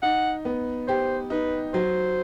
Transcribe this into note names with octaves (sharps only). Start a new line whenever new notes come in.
D#4 F#5
B3
G4 C5
D#4 B4
F#3 C5